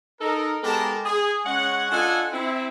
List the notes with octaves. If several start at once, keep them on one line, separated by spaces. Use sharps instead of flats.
D#4 A4 A#4
G#3 B3 G4 A4 A#4 A5
G#4
G#3 C#4 C#5 F#5
D4 F4 A4 D#5 F#5 G#5
C4 E4